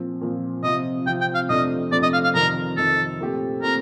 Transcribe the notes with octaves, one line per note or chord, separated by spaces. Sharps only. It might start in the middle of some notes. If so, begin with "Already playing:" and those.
Already playing: A#2 F3 C4
A#2 F3 C4
C3 F3 C4 F4 D#5
C3 F3 C4 F4 G5
G5
F5
F2 C3 F3 A3 D4 D#5
F2 C3 F3 A3 D4 D5
D#5
F5
F5
F2 C3 D#3 A#4
F2 C3 D#3 A4
A#2 A3 C4 G4
A#2 A3 C4 A#4